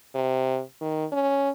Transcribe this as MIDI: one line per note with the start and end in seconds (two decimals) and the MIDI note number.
0.15 0.61 48
0.81 1.06 51
1.12 1.50 61